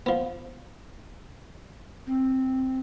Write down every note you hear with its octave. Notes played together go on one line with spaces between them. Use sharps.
F3 B3
C4